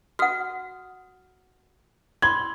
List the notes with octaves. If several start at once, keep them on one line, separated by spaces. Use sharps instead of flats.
F#4 F#5 D#6 F6
B5 C6 G#6